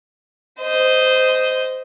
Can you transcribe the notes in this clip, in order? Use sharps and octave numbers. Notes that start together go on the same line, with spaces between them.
C5 D#5